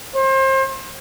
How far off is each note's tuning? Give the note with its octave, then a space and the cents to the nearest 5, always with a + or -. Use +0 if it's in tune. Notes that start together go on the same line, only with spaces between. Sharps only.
C5 +35